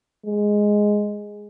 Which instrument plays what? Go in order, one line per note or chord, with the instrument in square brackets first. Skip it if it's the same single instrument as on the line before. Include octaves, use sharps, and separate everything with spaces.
[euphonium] G#3